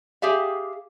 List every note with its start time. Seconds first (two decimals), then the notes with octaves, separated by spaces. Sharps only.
0.22 G4 G#4 E5 F5